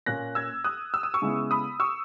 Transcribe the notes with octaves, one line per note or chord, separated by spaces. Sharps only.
A#2 A#3 C#4 F#6 A#6
E6 G#6
D#6 F#6
E6
D#6
C#6 E6
C#3 G#3 B3 E4
B5 D#6
C#6 E6